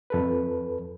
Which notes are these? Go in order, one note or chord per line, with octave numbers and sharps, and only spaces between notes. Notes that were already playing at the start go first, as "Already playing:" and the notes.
F2 A4 B4